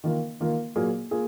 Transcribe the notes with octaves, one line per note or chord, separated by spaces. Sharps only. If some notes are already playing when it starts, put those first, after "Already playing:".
D#3 A#3 F4 A#4
D#3 A#3 F4 A#4
A#2 F#3 A#3 F4 G#4
A#3 F4 G#4